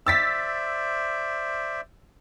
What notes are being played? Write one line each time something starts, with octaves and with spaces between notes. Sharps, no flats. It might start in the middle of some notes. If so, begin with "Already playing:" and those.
C5 D5 E5 E6 A6 B6